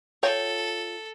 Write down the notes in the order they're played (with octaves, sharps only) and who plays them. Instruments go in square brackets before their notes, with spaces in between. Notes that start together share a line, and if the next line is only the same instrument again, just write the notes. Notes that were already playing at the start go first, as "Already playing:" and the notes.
[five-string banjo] F4 C#5 G5 [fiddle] A4